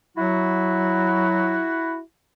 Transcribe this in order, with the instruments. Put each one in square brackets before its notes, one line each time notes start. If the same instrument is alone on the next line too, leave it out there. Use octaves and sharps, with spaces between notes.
[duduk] F#3 [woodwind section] E4 F#4